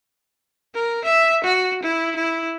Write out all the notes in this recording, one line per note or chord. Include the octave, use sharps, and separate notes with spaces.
A#4
E5
F#4
E4
E4